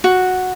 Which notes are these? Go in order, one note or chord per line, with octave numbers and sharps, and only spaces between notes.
F#4